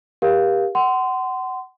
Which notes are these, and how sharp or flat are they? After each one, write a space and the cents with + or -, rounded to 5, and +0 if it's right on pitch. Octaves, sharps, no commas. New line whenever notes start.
G4 +20 A#4 +35 F5 +0
F#5 +25 C6 -20